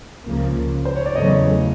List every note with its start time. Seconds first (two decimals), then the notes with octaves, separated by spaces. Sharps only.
0.24 C#2 C#3 F3 A#3
0.85 C5
0.96 C#5
1.06 D5
1.15 E2 C#3 F#3 A3 C#5 D#5